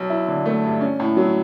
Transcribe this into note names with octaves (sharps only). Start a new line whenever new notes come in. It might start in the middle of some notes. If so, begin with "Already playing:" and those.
Already playing: B1
E4
D3
A3
G2
C#4
A2
F#3